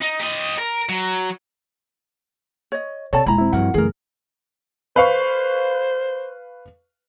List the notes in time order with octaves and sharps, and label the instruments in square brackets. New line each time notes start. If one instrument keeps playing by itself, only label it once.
[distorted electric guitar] D#4
G4 D#5
A#4
F#3
[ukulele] C#5 D#5
[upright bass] C3 [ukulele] A4 D5 A5 [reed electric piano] C#5
[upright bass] D#1 G#3 [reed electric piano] E4 G#5 [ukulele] A#5 B5
[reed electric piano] C4 E4
[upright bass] G2 F3 [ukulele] F#4 A#4 F#5
[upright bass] F#2 C#3 [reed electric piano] E3 A3 [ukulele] G#4 A#4
[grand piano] B4 F5 C#6 [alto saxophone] C5